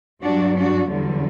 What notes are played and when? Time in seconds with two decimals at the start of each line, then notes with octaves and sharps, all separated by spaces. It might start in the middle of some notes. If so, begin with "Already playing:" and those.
0.23 G2 F#3 D4 F#4
0.56 D4 F#4
0.89 E2 D3 F#3 G3